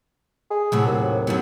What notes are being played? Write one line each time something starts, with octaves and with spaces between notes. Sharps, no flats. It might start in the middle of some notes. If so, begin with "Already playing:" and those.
G#4
A2 C3 F#3
D#2
F#2 F#3 B3